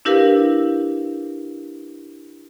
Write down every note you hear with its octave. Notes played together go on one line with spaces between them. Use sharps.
D4 E4 G4 A#4 B4 F5